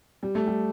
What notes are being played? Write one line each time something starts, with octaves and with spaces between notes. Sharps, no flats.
G3
A3
G3